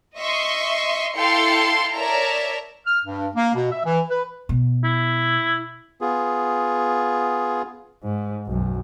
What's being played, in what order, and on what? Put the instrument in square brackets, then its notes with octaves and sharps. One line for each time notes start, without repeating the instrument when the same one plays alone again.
[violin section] D#5 E5 C6 C#6
E4 A4 F5 G5 C6 C#7
A#4 C#5 D5 E5 A5 A#5
[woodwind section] F6
G2
A#3
B2
E5
E3
B4
[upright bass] B2
[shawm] E4
[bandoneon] B3 F4 G#4
[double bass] G#2
B1 F#2